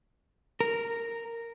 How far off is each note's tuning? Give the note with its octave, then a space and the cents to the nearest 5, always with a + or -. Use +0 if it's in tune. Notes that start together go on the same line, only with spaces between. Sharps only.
A#4 -10